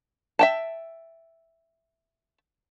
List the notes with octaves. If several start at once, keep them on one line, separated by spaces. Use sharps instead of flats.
E5 G5 A5